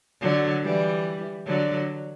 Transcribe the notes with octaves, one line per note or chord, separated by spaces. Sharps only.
D3 F#3
E3 G3
D3 F#3